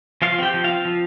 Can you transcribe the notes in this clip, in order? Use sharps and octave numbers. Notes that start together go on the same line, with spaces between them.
F3 F4 F5
C4 G4 G5
F3
C4 F4 F5
F3